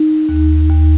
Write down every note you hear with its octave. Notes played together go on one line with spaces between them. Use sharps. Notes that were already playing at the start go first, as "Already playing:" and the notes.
Already playing: D#4
D#2
D#2